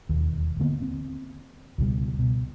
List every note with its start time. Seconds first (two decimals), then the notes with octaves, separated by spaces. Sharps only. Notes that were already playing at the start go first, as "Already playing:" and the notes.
0.09 E1 D#2
0.60 D3 A#3 B3
0.82 C4
1.78 C#2 B2 G3
2.19 B2